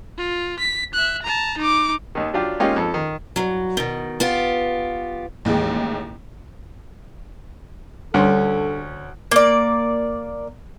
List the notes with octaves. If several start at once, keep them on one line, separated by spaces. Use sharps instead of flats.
F4
B6
E5 F#6
A5 A#5
D#4 D6
D#2 D#3
F#3 D4 F4 G4
G#3 A#3 C#4 D#4 F4 G4
F2 A4
D#3
G2 F#3
B2 D#3
B3 F4 G4
A1 D#2 E3 G#3
D2 G2 C#4 A4 C6
A#3 D5